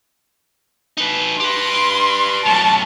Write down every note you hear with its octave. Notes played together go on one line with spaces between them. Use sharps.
D#4 B4
G4 B4 C6
F#2 A2 A5